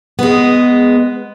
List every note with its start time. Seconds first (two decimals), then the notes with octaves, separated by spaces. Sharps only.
0.19 G#3 B3